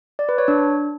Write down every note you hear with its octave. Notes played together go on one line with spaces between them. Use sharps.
D5
B4
C#5
D4